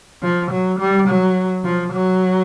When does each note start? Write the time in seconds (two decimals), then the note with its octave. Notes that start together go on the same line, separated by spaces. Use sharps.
0.23 F3
0.51 F#3
0.79 G3
1.08 F#3
1.64 F3
1.93 F#3